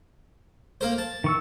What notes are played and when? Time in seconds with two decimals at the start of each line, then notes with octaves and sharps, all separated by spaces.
0.81 A#3 A#4 C5
0.98 A5
1.24 D#3 C#6 E6